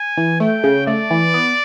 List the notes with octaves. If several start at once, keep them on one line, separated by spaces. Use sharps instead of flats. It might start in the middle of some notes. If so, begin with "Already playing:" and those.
Already playing: G#5
E3
A3 G5
C#3
A3 D5
E3
B3